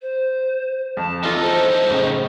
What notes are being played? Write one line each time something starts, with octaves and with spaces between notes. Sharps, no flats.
C5
F2 A5
E2 E3 D#4 F4 A4
A4 C5 A5
F#2 A2 C#3